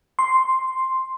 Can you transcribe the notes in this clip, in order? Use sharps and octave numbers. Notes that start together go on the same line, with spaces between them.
C6